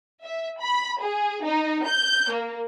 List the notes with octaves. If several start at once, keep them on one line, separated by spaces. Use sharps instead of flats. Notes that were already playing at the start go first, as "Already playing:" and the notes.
E5
B5
G#4
D#4
G6
A#3